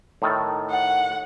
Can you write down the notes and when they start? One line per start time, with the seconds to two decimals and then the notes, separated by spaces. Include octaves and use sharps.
0.22 A2 D#3 A4
0.71 F#5